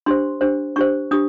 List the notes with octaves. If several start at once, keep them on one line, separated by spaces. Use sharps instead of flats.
D4 G4 C5 C6
D4 G4 C5
D4 G4 C5 C#6
D4 G4 D#6